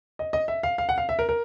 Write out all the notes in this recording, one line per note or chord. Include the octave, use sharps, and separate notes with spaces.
D#5
D#5
E5
F5
F5
F#5
F5
E5
A#4
A#4